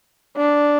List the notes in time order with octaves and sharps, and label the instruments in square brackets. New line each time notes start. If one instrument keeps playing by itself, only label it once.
[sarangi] D4